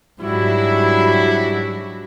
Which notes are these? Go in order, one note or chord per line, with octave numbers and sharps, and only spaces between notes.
G#2 F#3 G3 D4 E4 F#4